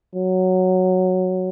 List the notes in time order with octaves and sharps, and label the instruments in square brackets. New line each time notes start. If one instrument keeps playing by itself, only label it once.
[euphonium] F#3